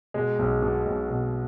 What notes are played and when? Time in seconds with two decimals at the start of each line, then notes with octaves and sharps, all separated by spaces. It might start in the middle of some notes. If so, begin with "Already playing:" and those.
0.14 B2 G#3
0.39 B1
0.62 B2
0.87 B1
1.10 B2